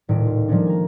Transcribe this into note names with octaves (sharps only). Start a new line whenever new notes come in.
D#1 C#2 A2 D7
F4
F3 G3 G#3 A#3 C#4 D4
G#5 A#5